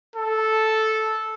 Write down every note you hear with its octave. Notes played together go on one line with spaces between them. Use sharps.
A4